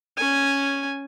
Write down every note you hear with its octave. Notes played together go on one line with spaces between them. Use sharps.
C#4 G#5